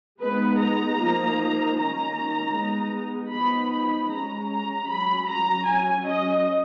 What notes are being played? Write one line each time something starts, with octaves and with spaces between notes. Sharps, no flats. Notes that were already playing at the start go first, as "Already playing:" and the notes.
G#3 B3 D#4 B4
A#5
F3 A#3 D#4
D#3 A#3 C#4 A#5
G#3 B3 D#4
F3 B3 D#4 B5
B5
G#3 C#4 A#5
A#5
F#3 C#4 B5
A#5
F#3 C#4 G#5
D#5